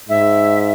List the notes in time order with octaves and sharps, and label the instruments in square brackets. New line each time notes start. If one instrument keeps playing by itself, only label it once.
[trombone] G#2 [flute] E5